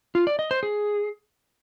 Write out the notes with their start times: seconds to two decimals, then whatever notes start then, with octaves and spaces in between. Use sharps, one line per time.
0.15 F4
0.27 D5
0.39 D#5
0.51 C5
0.63 G#4